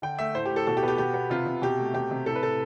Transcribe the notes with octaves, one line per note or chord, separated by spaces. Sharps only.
D3 G5
A3 E5
A2 C5
G4
A2
A4
B2 A4
G4
B3
G4
B2 G4
B3
C3 F4
C3
B2 G4
A3
C3 G4
C3
A2 A4
B4
A2 A4